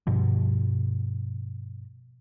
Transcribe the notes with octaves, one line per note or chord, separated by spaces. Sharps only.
G2 B2 F3